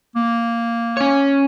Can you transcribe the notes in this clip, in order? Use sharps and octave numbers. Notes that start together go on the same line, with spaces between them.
A#3
C#4 C#5